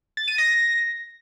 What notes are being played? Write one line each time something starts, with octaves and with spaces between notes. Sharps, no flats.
A6
D#7
A#6